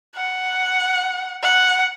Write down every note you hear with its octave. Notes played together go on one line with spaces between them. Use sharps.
F#5
F#5